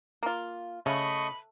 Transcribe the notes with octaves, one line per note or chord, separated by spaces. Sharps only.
A#3 F4
C#3 A3 D#5 B5 C#6 D#6